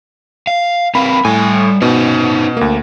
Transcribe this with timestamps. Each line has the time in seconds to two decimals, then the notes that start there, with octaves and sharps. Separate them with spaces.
0.47 F5
0.95 C4 A#4 F5 B5
1.25 A2 G3 G#5
1.82 B2 C#4 D#4 C5
2.57 D2 A#3